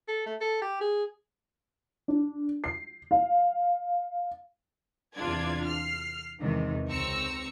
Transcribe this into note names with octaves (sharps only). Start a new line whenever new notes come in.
A4
A3
A4
G4
G#4
D4
C7
F5
E2 C3 D4 F4 D5 G#6
F6 C7
E2 G#2 C3 D#3 E3
C#2 C4 A#5 C#6 E6 C#7